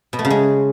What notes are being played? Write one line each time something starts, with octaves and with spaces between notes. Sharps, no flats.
B2
A3
C#3
G#3